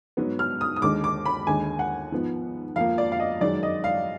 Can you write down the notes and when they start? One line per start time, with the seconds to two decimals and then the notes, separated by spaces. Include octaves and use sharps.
0.17 G#2 F#3 B3
0.39 F6
0.61 D#6
0.76 D#6
0.82 D#2 D3 G#3 D6
1.04 D6
1.26 B5
1.47 D#2 D3 G#3 G#5
1.79 F#5
2.12 G#2 F3 B3
2.76 F2 F3 A#3 F5
2.98 D5
3.12 F5
3.20 D#5
3.41 F#2 D#3 G#3 D5
3.63 D#5
3.84 F5